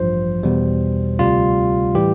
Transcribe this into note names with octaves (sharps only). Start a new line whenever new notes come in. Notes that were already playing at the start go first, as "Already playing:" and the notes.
Already playing: A1 G2 F3 C5
E2 B2 G3
D2 C3 G3 F4
A2 E3 G3 G4